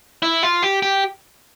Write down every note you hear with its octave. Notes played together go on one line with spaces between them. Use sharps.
E4
F4
G4
G4